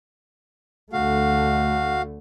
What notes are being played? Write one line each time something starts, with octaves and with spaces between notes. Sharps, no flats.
D2 D3 A3 F#4 F5